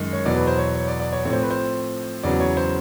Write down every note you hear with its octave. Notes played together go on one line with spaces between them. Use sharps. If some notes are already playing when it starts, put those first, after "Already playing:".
Already playing: F#2 D#3 G#3
C#5
E2 B2 F#3 B3 D5
B4
C5
C#5
C#5
D5
D5
C#5
A2 F3 A3 C4 C#5
C5
B4
C5
E2 C#3 F#3 B3 D5
C#5
C5